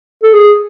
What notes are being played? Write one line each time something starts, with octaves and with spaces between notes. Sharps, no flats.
A4
G#4